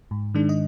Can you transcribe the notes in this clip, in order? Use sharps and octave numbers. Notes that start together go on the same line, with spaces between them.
G#2
D#3 G#3 D4
D#5